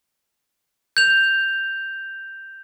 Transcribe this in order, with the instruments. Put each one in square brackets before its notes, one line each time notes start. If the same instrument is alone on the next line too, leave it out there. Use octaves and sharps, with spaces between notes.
[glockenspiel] G6 F7